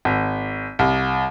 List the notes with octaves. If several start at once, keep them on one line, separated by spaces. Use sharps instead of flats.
G#1
C2